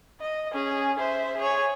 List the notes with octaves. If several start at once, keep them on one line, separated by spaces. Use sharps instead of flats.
D#5
C#4 G#4
C5 E5
G#4 C#5